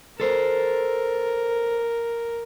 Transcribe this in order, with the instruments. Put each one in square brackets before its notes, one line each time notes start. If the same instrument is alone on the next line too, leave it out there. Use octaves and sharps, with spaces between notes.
[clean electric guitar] A4 C5 [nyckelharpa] A#4